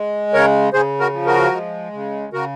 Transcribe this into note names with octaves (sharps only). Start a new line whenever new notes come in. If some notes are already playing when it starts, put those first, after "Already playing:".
Already playing: G#3
C#3 A#4 C#5
C#3 G#4 C5
F#4 A#4
F3
F#4 A#4
G#3
C#3
C#3 F#4 A#4